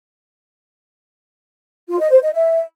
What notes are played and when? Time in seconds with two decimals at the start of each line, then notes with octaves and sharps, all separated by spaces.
1.89 F4
2.00 D#5
2.11 C5
2.22 D#5
2.33 E5